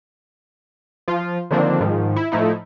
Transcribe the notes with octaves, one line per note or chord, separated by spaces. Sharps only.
F3 F4
D3 D#3 F3 A#3 C4 D4
G#2 D#3 F3
E4
A2 F3 A3 D#4 E4